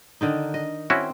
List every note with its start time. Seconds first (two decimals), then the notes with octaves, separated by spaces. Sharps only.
0.21 D3 D#3 D#4
0.54 D#5
0.90 C4 C#4 E4 F#4